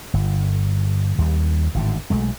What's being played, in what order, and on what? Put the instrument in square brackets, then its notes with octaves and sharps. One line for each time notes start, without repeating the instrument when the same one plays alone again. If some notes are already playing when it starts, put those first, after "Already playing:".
[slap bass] G1
D#2 G3
G#1 A2 D3
B1 G#3 A3